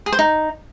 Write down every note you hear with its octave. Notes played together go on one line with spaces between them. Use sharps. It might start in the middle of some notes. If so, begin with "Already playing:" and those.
G#4
C5
D#4